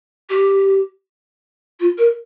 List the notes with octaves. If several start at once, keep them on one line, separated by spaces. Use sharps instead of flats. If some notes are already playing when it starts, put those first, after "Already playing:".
G4
F4
A#4